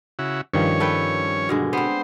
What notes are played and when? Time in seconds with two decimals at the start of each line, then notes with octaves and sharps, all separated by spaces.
0.19 C#3 E4 F#4
0.54 G2 D#3 F3 C#4 C#5
0.80 A4 B4 G5
1.49 B2 D3 G#3
1.73 B3 C4 C5